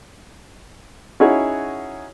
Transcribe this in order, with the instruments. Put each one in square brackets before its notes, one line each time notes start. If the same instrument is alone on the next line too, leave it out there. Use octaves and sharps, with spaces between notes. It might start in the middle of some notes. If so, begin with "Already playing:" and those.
[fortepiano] C#4 D#4 E4 F#4 G#4 C#5